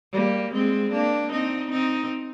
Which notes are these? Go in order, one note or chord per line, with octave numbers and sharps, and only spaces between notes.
G3 A#3
G#3 C4
A#3 D4
C4 D#4
C4 D#4